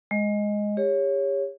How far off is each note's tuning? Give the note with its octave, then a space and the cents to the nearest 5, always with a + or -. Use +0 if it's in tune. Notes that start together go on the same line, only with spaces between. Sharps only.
G#3 +0 D#5 +0
G4 +40 C#5 +0